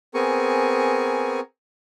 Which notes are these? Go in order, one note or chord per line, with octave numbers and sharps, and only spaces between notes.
B3 C4 G#4 A#4 G#5 C#6